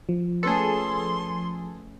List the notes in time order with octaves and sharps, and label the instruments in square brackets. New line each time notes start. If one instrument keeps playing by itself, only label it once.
[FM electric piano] F3
[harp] A3 C#4 B4 [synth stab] G#4 A4 [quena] C6